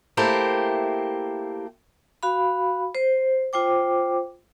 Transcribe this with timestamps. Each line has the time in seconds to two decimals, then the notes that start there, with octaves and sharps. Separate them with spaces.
0.17 A3 A#3 E4 G4 C5
2.23 F#4 F5 B5
2.95 C5
3.53 F4 C5 G5 D6